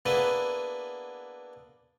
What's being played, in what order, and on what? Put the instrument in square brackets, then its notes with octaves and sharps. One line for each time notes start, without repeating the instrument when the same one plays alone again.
[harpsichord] A#3 B3 D4 E4 G#4 B4